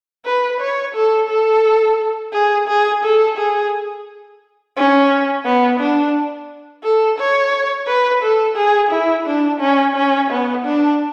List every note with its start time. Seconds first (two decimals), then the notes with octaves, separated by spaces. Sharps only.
0.26 B4
0.61 C#5
0.95 A4
1.29 A4
2.33 G#4
2.68 G#4
3.04 A4
3.38 G#4
4.77 C#4
5.45 B3
5.80 D4
6.83 A4
7.19 C#5
7.87 B4
8.23 A4
8.56 G#4
8.91 E4
9.27 D4
9.60 C#4
9.96 C#4
10.30 B3
10.65 D4